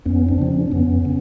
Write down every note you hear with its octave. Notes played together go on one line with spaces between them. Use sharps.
F2 B3 C#4
C4 D4
C#3 F3
C#4
D4
F2 B3 C#4
C#3